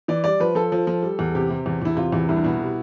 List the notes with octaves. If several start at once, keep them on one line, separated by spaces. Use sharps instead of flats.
E3 D5
G3 D5
F3 B4
F3 A4
F3
F3
G3
E2
C3 G4
C3
E2
E2 E4
C3 F4
E2 E4
C2 E4
D4
B2 E4
G3